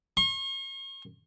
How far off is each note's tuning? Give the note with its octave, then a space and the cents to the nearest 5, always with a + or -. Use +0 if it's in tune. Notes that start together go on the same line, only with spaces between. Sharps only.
C#6 -45